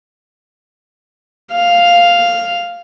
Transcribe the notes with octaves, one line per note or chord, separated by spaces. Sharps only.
F5